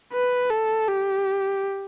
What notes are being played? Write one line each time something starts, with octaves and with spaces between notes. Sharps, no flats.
B4
A4
G4